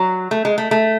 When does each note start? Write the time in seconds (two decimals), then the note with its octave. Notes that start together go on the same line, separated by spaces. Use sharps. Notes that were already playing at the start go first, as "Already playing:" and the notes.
Already playing: F#3
0.31 A3
0.45 G#3
0.58 A3
0.71 A3